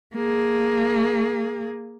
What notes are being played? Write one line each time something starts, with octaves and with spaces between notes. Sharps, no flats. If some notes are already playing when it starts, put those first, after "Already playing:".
A#3 G#4